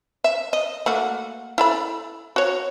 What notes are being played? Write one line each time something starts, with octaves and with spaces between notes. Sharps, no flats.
E5
D#5
A3 A#3 F#4
E4 A4 B5
F#4 C#5